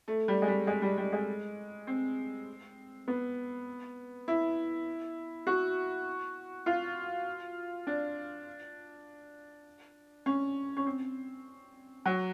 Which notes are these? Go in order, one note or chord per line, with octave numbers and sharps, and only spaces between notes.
A3
G3
G#3
G3
G#3
G3
G3
G#3
C4
B3
E4
F#4
F4
D4
C#4
C#4
C4
F#3